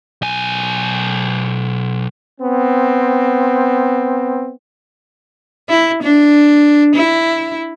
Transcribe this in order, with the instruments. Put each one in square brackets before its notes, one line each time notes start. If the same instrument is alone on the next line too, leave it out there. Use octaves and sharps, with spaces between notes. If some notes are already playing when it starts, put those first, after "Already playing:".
[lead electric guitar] B1 G#5
[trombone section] B3 C4
[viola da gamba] E4
D4
E4